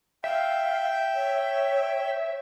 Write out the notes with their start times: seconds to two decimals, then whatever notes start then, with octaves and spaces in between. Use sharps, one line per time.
0.24 E5 F5 G5
1.15 C#5